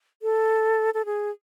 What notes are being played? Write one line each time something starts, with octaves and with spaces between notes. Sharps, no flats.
A4
A4
G#4